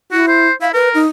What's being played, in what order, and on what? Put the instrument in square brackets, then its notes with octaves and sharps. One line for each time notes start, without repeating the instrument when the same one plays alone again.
[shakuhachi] E4 [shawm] F#4
[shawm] C5
[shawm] E4 [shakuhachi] F5
[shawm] A#4 [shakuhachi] B4
[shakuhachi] D#4